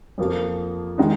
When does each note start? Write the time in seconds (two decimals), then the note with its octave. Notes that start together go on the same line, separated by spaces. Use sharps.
0.18 F2 F3 A#3 F4
0.98 D#3 G#3 D#4